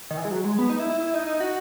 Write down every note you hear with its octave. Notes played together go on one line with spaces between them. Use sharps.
D#3
E3
G#3
F#3
G#3
B3
D#4
E4
E4
E4
D#4
D#4
F#4